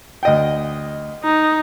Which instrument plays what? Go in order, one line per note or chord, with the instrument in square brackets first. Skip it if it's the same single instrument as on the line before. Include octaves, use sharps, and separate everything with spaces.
[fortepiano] D2 D#5 G5
[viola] D#4